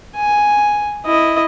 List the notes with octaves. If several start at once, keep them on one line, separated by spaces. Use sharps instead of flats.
G#5
E4 D#5